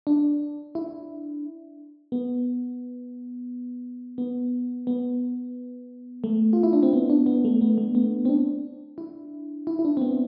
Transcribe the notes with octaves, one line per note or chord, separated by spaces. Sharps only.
D4
E4
B3
B3
B3
A3
F4
E4
D4
C4
B3
D4
B3
A3
B3
A3
B3
C4
D4
E4
E4
E4
D4
C4
B3